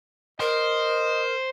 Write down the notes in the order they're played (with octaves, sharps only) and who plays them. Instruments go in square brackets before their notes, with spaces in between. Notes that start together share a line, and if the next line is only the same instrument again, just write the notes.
[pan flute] A#4 [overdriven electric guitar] C5 [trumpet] D#5